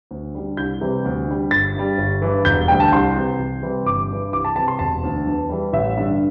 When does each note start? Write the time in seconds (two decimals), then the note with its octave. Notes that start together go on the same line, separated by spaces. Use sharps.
0.11 D2
0.35 D3 G3
0.57 C2 G6
0.81 C3 E3 G3
1.05 D2
1.28 D3 G3
1.51 G1 A6
1.75 G2 G3
1.98 G1
2.22 G2 E3
2.45 E1 G6
2.68 D2 D3 G3 G5
2.80 A5
2.92 C2 C6
3.16 C3 E3
3.39 C2
3.62 C3 E3 G3
3.85 G1 D6
4.09 G2 E3
4.33 C2 D6
4.45 A5
4.56 C3 E3 A5
4.68 C6
4.79 E1 A5
5.04 D2 D3
5.27 E2
5.49 E3 G3
5.73 A1 E5
5.97 G2 D3 G3